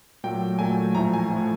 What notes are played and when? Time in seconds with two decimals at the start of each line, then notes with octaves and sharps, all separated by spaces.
0.24 A#2 F#3 A3 G5
0.59 A#2 F#3 A3 G#5
0.95 A2 F3 A3 A#5
1.14 G#5
1.30 A2 F3 A3